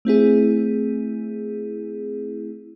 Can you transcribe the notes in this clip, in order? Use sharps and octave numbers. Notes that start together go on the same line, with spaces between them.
A3 C4 E4 G#4